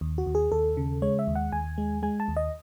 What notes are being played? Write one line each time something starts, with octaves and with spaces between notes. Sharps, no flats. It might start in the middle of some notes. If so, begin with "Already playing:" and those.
D#2
F#4
D#2
G#4
D#2 A4
C#3
G#3 C#5
E5
D#2
F#5
D#2 G#5
G#3
G#3 G#5
A5
D#2
D#5